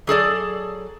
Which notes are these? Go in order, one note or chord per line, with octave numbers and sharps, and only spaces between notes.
F#3 G#4 A4 D5